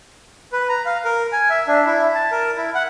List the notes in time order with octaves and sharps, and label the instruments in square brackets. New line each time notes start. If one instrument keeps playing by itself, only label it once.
[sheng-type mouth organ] B4
A#5
F5
A#4
G#5
E5
D4
E4
A5
A#4
E4
F#5